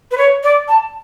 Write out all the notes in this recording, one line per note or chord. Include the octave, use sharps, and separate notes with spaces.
B4
C#5
D5
A5